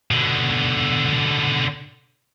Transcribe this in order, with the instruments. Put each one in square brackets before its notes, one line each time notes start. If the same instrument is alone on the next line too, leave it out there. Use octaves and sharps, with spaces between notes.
[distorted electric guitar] B2 D3